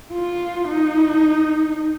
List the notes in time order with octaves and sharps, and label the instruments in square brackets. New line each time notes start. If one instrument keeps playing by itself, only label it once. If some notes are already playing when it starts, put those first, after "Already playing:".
[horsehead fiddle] F4
D#4